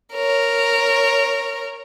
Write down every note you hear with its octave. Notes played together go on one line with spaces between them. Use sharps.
A#4 C#5